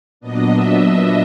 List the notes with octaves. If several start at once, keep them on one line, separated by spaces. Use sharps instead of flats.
A#2 F#3 B3 D4 D#5
E5
E5